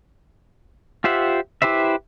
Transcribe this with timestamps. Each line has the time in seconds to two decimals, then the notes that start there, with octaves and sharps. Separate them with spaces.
1.04 F4 G4 C5 E5 F#5
1.62 E4 G4 B4 C5 E5